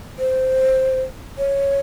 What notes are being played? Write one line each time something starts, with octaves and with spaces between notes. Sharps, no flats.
C5
C#5